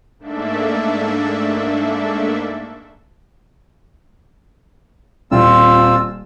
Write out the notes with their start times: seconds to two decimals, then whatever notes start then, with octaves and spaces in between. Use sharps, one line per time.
0.19 G#2 A3 A#3 D4 A4 E5
5.32 D#1 C4 F4 E6